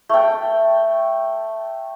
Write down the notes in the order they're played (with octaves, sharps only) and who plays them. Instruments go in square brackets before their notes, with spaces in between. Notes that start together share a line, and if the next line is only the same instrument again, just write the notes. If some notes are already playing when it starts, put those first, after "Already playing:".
[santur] A3 G5